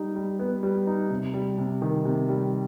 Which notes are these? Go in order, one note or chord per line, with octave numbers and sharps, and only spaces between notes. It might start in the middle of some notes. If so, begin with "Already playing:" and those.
Already playing: G3 D#4
G3
B3
G3
D#4
C3
G3
C3
D#3
C3
G3